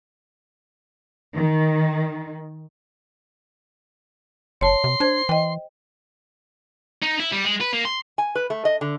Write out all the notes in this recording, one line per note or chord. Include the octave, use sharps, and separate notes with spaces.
D#3
F#1 C#5 A5 C6
C3
D4 C5 G#6
E3 D#5 G5
D#4
E4
G3
G#3
B4
A#3
C6
G#5
B4
A3
D#5
D3